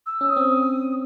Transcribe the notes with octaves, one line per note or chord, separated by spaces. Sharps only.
E6
C#4
D#6
C4